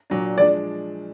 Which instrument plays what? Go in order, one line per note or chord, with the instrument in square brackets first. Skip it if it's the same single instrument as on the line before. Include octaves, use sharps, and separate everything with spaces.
[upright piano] A#2 F#3 D4
[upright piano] F3 G#3 D4 [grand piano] D5